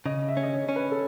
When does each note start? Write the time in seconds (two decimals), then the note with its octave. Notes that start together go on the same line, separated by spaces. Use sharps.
0.06 C#3 D#5
0.28 E5
0.37 C#4
0.43 D#5
0.53 C#5
0.69 C#4
0.76 B4
0.91 A4